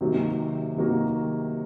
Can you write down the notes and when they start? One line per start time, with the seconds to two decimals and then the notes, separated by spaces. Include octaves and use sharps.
0.01 C3 D#3 F#3 A#3 F#4
0.76 C3 D#3 F#3 A#3 F#4